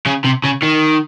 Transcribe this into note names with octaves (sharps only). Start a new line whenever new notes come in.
C#3
C3
C#3
D#3